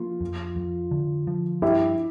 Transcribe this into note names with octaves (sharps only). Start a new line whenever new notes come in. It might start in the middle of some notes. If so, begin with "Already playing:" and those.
Already playing: F3 A#3 F4
F2
F2
D3
F3
G2 E4 G4